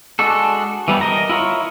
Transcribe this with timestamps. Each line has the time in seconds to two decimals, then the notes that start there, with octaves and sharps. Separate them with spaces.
0.19 G#3 D4 F#4 A4
0.88 E3 G3 B3 C4
1.01 A#4 D#5 A#5
1.29 E4 F4 A#4 C#5